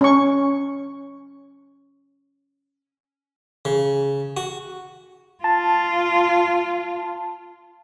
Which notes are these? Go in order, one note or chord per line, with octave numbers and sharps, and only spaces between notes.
C#4 C#6
C#3
F#4
F4 A5